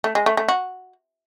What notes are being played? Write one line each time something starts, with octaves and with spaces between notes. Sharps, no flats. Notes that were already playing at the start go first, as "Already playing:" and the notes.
A3
G#3
A3
A3
F#4